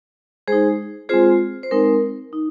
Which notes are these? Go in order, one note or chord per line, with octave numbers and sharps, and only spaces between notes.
G#3 D#4 G#4 C5
G#3 C4 F4 G#4 C5
C5
G#3 C4 D#4 A#4
D#4